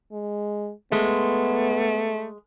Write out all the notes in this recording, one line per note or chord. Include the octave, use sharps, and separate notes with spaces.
G#3
G#3 A3 B3